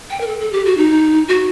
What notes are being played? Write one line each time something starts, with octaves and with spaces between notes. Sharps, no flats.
G5
A#4
A4
A4
G4
F#4
D#4
F#4